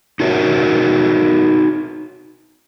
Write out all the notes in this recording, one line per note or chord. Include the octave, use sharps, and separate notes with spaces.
D#4 F#4 A#4 C#5 E5